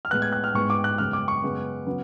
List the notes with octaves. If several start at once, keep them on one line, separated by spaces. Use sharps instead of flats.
F6
A2 G#3 B3 F#6
G#6
F#6
F6
G#2 G#3 B3 C#6
D6
F#6
F#2 C#3 G#3 B3 F6
D6
C#6
F#2 C#3 G#3 B3
C#3 F#3 B3